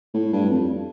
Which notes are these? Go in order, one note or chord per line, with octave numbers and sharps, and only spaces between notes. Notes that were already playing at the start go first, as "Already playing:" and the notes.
A2
G2
F2